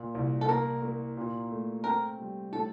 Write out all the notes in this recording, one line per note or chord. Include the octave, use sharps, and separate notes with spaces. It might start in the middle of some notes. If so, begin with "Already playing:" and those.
Already playing: A#2
C2
A4
A#3 A#4
A#3
A#2
A3
C4 A#4
G3
A2 A4